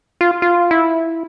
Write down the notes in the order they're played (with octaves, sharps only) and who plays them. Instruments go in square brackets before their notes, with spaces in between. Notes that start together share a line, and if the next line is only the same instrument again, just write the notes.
[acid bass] F4
F4
E4